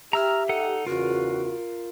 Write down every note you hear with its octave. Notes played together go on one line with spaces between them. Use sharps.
G4 E5 A#5 E6 F6
D#4 A4 F#5
E2 C#3 F4 F#4 A#4